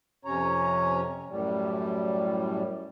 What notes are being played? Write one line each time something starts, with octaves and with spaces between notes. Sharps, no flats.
F2 C3 C#4 C#5 A#5
F#2 A2 G3